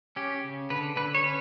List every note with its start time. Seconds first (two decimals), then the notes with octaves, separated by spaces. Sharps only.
0.16 C#4 G4
0.44 C#3
0.70 D3 B4
0.96 D3 B4
1.15 C#5
1.24 C#4 B4